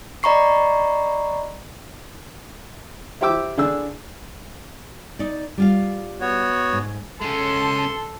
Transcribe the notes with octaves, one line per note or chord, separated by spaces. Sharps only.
D5 D#5 A#5 B5 C#6 C7
E4 G4 C5 G5 D6 E6
D3 D4 G#4 E6
D#4 D5
G3 F4 F5
B3 F#4 C#5
G#2
G#3 C#4 A4 C6